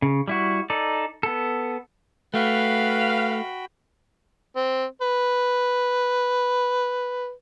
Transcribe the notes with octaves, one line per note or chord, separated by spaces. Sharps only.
C#3
G3 E4 F#4
D#4 A4 D5
B3 A4
A3 F#4 B4 F5 G5 B5
C4
B4